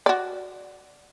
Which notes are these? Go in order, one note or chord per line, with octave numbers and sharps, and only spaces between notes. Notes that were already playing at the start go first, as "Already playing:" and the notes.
F#4 D5